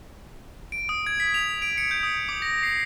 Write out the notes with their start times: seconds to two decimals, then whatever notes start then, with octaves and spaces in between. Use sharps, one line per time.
0.72 D7
0.89 D#6
1.06 G#6
1.20 B6
1.34 F7
1.62 D7
1.78 C#7
1.91 G6
2.03 D#6
2.29 D6
2.42 A#6
2.63 C7